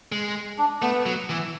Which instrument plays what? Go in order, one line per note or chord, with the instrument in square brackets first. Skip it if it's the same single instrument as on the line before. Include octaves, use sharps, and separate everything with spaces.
[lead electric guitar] G#3
[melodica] D4
[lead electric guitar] A3 [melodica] B3
[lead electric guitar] F#3
E3